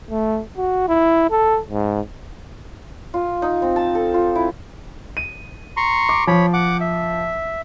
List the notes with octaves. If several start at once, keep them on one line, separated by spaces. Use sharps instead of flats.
A3
F#4
E4
A4
G#2
F4
D#4
C4
A5
A4
F4
E4
D#7
A#5 C6 C#6
D6
F3 C#5 B5
F#5 D6
E5